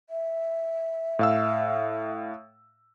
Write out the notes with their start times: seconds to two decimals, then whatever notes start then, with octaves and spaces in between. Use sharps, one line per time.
0.10 E5
1.19 A2 F5 E6